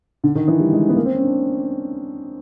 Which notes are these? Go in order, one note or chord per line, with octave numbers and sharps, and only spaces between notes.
D3
D#3
E3
G3
G#3
B3
A#3
C4
C#4
D4